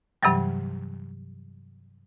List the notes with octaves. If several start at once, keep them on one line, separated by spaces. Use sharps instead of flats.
G2 C3 E3 F#3 G3